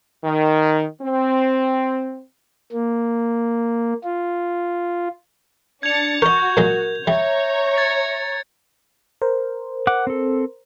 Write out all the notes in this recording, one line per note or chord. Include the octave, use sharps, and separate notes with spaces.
D#3
C4
A#3
F4
D4 G#6 A6 C#7 F7
F#4 A#4 D#5 C#6 G6
A#2 F#3 G#3 A#4
G3 C#5 E5 A#5
G#6 A6 C#7
A#4 C5
F#5 D6
C4 A4